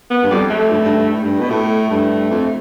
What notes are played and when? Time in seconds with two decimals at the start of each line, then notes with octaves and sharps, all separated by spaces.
0.10 B3
0.23 G2
0.30 F2 G3
0.50 A3
0.70 G2
0.78 A2
0.85 G2
0.97 G2
1.13 A2
1.24 G2
1.40 B2
1.50 A2 A3
1.90 G2
2.30 F2